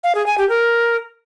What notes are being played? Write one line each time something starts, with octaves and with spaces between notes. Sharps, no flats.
F5
G#4
G#5
G4
A#4